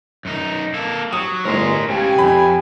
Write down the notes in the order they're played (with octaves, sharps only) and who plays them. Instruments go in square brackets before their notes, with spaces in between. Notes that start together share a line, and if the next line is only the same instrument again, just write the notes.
[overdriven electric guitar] F#2 D#4
A#3 A4
[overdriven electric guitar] F#3 [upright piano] D#6
[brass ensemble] G1 G#3 [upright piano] A2 [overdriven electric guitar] A#4 C5
[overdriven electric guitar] C#2 C#3 [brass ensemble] G4 G5 G#5
[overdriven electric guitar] F2 [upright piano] B5